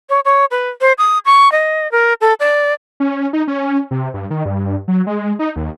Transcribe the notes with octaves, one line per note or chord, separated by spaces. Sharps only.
C#5
C#5
B4
C5
D#6
C#6
D#5
A#4
A4
D5
C#4
D#4
C#4
C3
G2
D#3
G2
F#3
G#3
D#4
D#2